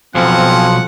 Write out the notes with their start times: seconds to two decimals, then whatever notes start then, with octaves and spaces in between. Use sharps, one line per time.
0.15 B1 F3 C4 F5 F#5 G#5